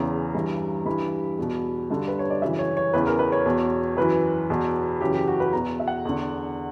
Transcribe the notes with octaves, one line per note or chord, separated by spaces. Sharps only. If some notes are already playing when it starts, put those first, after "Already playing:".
Already playing: E2 C#3 E3 A#5
G2 E3
G2 E3 B5
E2 B2
G2 D3
B4
C#5
D5
F#2 C#3 E3 E5
C#5
C#5
E2 C#3 E3 B4
A#4
B4
C#5
E2 B2
F#2 E3 B4
E2 B2
F#2 C#3 E3 G4
G4
F#4
B4
E2 B2 A#5
E5
F#5
E2 D3